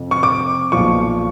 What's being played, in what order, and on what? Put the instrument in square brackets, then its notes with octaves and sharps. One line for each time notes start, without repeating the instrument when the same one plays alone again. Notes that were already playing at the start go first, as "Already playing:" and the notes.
Already playing: [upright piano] F2 C3
C#6
D6
B1 A#2 F3 C#6